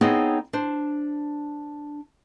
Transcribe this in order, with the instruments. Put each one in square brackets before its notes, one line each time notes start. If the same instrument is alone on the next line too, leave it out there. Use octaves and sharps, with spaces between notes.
[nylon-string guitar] B3 C4 D#4 G#4 C#5
D4 C5